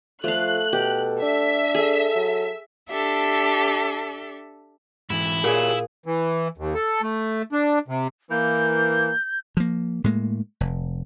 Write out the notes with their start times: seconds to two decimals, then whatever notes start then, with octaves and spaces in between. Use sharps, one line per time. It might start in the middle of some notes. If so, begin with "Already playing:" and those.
0.24 F3 A3 A4 F5 F#6
0.73 B2 G4
1.22 D4 E5
1.75 G#4 A4
2.15 F#3
2.89 D4 G4 A4 E5
5.10 G#2 E3 E4
5.44 A#2 G4 G#4 C#5
6.06 E3
6.58 D#2
6.75 A4
7.02 A3
7.52 D4
7.88 C3
8.31 E3 A#3 G6
9.57 F3 A#3
10.04 A2 G#3 A#3
10.61 F1